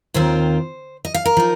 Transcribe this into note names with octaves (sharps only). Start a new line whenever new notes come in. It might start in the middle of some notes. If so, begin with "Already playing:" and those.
D#2 D#3 C4 F4 C5
D#5
F5
A#4
F3 D#4